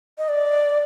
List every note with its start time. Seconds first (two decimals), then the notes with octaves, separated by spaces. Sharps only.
0.18 D#5
0.29 D5